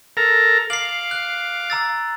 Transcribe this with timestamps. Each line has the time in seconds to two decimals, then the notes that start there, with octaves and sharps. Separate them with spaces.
0.17 A4 A#4 A#5
0.70 F5 D6 C7 F#7
1.11 F#6
1.70 A#5 E6 A6